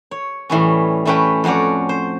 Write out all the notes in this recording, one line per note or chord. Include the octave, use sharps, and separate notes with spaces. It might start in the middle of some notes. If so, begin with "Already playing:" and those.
C#5
A2 E3 G3 C#4
E3 A3 C#4 B4 G5
F2 C#4 F#4 C#5 D5
C5